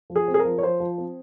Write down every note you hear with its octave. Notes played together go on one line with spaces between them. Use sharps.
F3
G#4
C4
G#4
A#4
F3
C#5
F3 C5
F3
C4